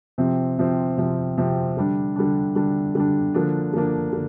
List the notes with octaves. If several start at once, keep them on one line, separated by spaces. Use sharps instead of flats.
C3 F3 C4
C3 F3 C4
C3 F3 C4
C3 F3 C4
D3 G3 D4
D3 G3 D4
D3 G3 D4
D3 G3 D4
D3 F3 A#3 D4
D3 F3 A#3 D4
D3